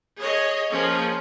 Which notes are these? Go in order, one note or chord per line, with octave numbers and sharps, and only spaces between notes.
G#4 C#5 D#5
F3 A#3 C#4 G#4